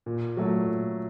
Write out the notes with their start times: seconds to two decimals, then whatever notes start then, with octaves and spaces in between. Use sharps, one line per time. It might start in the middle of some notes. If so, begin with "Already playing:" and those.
0.06 A#2
0.37 F#3 A3
0.68 A#2